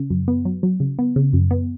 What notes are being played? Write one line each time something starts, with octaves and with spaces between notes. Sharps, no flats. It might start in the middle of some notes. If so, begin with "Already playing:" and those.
Already playing: C#3
F#2
B3
F#3
F#3
C#3
B3
C#3
F#2
B3